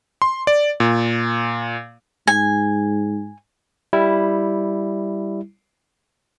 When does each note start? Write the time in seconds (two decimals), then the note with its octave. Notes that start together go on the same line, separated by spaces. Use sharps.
0.22 C6
0.47 D5
0.80 A#2
2.27 G#2 G#5
3.93 G3 E4